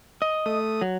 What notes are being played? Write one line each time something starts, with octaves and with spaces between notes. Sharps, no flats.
D#5
A3 D#6
F#3